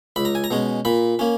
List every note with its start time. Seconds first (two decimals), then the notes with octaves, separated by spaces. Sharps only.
0.16 C#2 B5
0.25 A#5
0.35 G#5
0.44 A#5
0.51 B2 G#3 C#4
0.85 A#2 B5
1.19 A#3 C#4